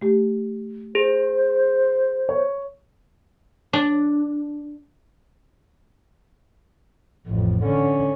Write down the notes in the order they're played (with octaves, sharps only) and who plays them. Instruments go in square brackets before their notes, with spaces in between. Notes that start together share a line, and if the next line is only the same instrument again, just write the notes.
[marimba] A3 G4
[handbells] G#4 [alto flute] C5
[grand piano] C#5
[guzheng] D4
[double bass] A1 F2
D3 C#4